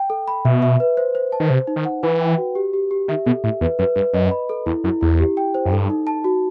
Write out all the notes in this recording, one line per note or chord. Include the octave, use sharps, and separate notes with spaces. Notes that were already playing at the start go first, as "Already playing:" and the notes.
Already playing: G5
A4
B5
B2 E5
E5
B4
C5
C5
A5
D#3
C3 C5
D#4
D#3
F#5
E3 B4
G5
F#4
G4
G4
G4
D#3 E5
B2 A4
A2 E5
E2 B4
F#2 B4
G2 B4
F#2 D#5
B5
A4
E2 E4
F#2 E4
E2 E4
G4
G5
C5
F#2
G2 A4
D#4
A5
F#4